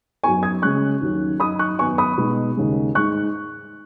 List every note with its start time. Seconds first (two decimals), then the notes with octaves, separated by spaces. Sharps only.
0.24 F#2 F#3 B3 D#4 G#5 C#6
0.43 D#6 G#6
0.62 C#3 G#3 C#4 C#6 F#6
1.01 D#2 D#3 F#3 C#4
1.40 F#2 F#3 D#4 B5 D#6
1.59 C#6 F#6
1.79 F#2 D#3 B3 D#4 G#5 C#6
1.98 B5 D#6
2.18 B2 G#3 B3 D#4
2.57 D#2 C#3 G#3
2.95 G#2 G#3 D#4 C#6 F#6